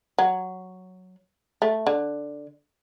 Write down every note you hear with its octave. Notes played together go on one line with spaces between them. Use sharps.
F#3
A3
D3